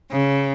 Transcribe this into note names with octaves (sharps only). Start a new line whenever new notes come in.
C#3